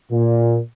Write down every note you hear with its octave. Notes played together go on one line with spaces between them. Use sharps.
A#2